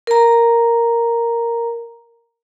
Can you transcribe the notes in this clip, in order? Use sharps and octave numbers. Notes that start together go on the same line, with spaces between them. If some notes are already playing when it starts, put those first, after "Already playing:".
A#4 A#5